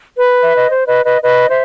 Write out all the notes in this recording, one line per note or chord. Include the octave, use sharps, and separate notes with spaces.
B4
E5
D#5
C5
B4 D#5
B4 D#5
B4 D#5
C5 E5